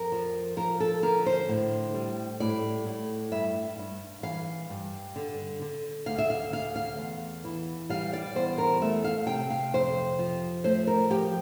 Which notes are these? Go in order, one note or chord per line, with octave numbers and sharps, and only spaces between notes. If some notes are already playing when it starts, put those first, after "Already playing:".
Already playing: F2 A#4
F3
F3 A#4
A4
D3 A#4
C5
A2
G3
A2 D5
A2
G2 E5
G2
E3 F5
G2
D3
D3
D2 F5
E5
F5
D2 F5
F5
E2
E3
G3 F5
D5
E2 C5
A#4
A3 E5
F5
C3 G5
F5
F2 C5
F3
A3 C5
A#4
F3 G4